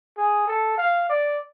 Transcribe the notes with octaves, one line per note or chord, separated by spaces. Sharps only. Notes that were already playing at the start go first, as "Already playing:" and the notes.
G#4
A4
F5
D5